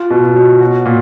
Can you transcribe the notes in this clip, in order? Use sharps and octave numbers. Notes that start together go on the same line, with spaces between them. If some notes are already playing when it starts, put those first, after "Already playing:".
Already playing: F4
B2
F#3
F#4
A#2